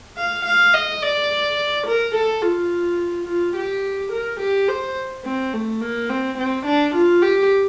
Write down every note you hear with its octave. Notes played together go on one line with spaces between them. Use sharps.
F5
F5
D#5
D5
A#4
A4
F4
F4
G4
A#4
G4
C5
C4
A3
A#3
C4
C4
D4
F4
G4